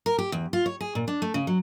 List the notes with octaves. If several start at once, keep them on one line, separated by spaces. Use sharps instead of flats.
A#4
G4
E2
F4
C#5
G#4
A#2
D4
A3
C#3
F#3